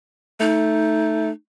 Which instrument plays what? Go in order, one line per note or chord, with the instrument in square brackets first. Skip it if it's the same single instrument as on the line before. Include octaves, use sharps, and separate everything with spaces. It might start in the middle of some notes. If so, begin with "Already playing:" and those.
[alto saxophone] A3 [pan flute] D#4